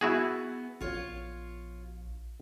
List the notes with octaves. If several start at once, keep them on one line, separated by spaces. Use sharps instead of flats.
B3 E4 F#4 G#4
A#1 F4 C#5